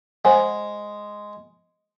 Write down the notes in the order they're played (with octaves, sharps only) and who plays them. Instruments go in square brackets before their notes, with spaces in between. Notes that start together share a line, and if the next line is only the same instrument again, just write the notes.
[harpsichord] G#3 [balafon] C5 F#5 G#5